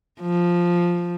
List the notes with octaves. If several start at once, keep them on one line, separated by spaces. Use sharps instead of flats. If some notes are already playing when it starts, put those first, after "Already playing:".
F3